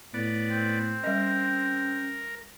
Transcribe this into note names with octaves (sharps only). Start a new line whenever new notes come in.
A2 B3 D5
C4
G3 C#4 A#4 D#5